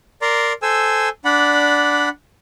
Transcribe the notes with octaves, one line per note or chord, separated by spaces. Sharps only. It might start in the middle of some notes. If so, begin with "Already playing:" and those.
A#4 D5 A#5 C6
A4 C5 G#5 E6
D4 D5 F#5 B5